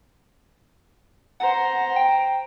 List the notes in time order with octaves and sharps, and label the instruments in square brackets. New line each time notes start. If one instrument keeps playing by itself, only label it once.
[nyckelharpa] C5 A#5 [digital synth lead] F#5
[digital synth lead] G5